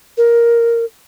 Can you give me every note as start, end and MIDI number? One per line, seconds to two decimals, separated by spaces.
0.18 0.85 70